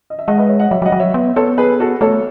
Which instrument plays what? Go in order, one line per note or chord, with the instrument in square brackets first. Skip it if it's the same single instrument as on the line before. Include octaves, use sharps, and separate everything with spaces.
[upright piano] D#5
E5
[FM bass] G#3 [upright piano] D#5 F#5
[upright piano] B4 D#5
C#5 E5
D#5 F#5
[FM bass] F#3 [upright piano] C#5 E5
[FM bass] F#3
[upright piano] D#5 F#5
[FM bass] F#3
[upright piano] C#5 E5
[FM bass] B3
[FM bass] B3 [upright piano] A4 C#5
[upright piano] G#4 B4
F#4 A4
[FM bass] A3 [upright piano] A4 C#5